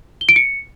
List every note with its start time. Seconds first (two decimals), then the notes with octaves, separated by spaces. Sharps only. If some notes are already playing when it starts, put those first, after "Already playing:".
0.21 G7
0.29 D7
0.36 C#7